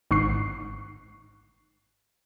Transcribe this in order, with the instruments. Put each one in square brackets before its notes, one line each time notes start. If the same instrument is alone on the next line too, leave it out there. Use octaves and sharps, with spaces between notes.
[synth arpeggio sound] G#1 G#2 C#6 F#6 C7